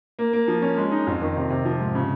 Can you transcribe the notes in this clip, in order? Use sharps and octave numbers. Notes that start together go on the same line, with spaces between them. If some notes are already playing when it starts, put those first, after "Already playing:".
A#3
A#3
F3
C#4
G#3
D#4
F2
D#3
C3
C3
F3
G#2
C#3